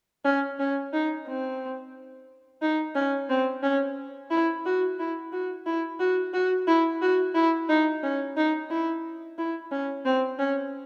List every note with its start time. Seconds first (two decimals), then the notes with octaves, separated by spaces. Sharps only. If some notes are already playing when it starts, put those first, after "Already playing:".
0.25 C#4
0.59 C#4
0.93 D#4
1.27 C4
2.61 D#4
2.95 C#4
3.29 C4
3.63 C#4
4.31 E4
4.65 F#4
4.99 E4
5.32 F#4
5.66 E4
5.99 F#4
6.33 F#4
6.67 E4
7.02 F#4
7.35 E4
7.69 D#4
8.03 C#4
8.36 D#4
8.70 E4
9.38 E4
9.71 C#4
10.05 C4
10.39 C#4